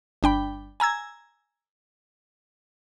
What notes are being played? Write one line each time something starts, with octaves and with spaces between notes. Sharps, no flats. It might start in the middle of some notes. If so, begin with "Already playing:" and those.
G1 D4 G5 B5
G#5 A#5 E6 G#6